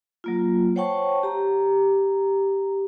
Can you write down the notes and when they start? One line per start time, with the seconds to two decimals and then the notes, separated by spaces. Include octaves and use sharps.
0.24 F#3 A#3 F4
0.76 C5 C#5 F#5 G5 A5 C#6
1.23 G4 A#5